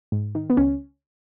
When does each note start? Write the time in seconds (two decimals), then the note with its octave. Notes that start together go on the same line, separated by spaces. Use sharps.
0.12 G#2
0.35 D#3
0.50 B3
0.57 C#2 C#4